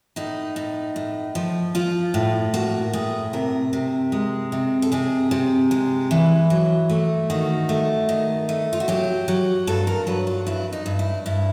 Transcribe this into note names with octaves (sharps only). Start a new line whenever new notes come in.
A2 D#4
A2
A2
F3
F3 F4
A2
A#3 F#4
A2 G#4
C3 A#4
C3
G#3
C3
A4
C3 G#4
C3
G#3
E3
F#3
A3
D#3 F#4
A3
D#3
A3
F4
F#4
F#3 G4
F#3
G2 A4
A#4
F#3 B4
F4
G2 E4
D#4
G2
E4
G2 E4